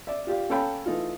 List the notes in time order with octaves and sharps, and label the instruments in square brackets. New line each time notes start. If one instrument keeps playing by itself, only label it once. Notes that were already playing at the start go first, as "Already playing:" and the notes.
[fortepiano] D5 E5
F4 G4 D5 F5
C#4 A4 C#5 F5 G5 B5
E3 A3 D#4 F4